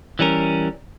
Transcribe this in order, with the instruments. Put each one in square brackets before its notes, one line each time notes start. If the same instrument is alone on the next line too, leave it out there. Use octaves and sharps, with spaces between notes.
[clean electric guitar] E3 G3 C#4 A#4